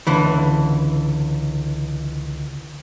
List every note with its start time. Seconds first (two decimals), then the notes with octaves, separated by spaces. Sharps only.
0.07 C#2 D3 E3